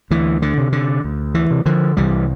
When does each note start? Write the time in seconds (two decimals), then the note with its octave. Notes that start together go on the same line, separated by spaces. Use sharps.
0.11 D2 E3
0.42 D3
0.58 C3
0.72 D3
1.04 D2
1.35 E3
1.51 C3
1.66 D3 F3
1.97 C2 E3 G3